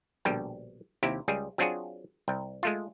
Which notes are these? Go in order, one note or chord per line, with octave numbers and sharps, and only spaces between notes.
A#1 B2 D3 G3 G5
D#2 C3 E4 G4
C#2 G3 G#4
F#3 C4 D4 F4 F#4 G#4
C2 G5
G#3 A3 F4